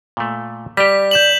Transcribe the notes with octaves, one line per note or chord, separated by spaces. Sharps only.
A#2 A3
G3 G4 D5 B6
G6 E7 F#7